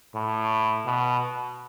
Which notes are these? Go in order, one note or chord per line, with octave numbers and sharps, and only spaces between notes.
A2
B2